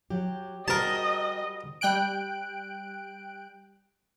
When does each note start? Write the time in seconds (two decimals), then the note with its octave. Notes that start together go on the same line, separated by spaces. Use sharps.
0.10 F#3 G4
0.68 G3 F#4 G#4 A#4 C5 D#5 A5 A#5
1.81 G3 G5 F#6 D7